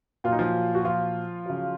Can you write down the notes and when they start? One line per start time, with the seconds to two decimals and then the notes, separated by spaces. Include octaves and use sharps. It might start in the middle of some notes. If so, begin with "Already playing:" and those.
0.24 A#2 F#3 F4
0.32 D#4
0.39 F3 F4
0.75 F#4
0.85 F3 F4
1.46 C#3 F#3